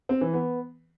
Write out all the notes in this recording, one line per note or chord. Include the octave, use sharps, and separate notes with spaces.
C4
E3
B3